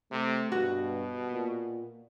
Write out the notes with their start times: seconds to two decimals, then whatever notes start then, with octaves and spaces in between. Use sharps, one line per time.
0.11 C3 A3
0.52 G2 B2 F#4
1.31 A#2